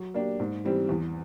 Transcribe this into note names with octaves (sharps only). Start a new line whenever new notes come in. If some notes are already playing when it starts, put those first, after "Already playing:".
Already playing: F#3
A#3 D4 G4
G#2
E3 G3 C4
E2